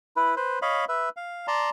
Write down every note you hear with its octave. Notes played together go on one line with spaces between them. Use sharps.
E4 B4
B4 C5
C#5 D#5 F5 B5
B4 E5
F5
D5 A5 A#5 C6